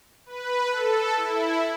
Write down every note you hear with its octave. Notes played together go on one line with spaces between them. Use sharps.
B4
A4
E4